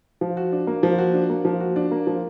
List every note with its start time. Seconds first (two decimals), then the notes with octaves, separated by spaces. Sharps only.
0.21 F3
0.37 F#4
0.52 D4
0.67 A#3
0.83 F3
0.98 F#4
1.14 D4
1.30 A#3
1.45 F3
1.61 F#4
1.76 D4
1.91 A#3
2.07 F3